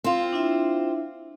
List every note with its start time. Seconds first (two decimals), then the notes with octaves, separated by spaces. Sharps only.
0.04 C4 F4
0.33 D4 E4 E5